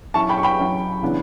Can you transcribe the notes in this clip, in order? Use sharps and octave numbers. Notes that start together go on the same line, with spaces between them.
F#3 C#4 E4 A5 C#6
G5 B5
C#6
G5 B5
F#3 C#4 E4
C#3 E3 B3 D4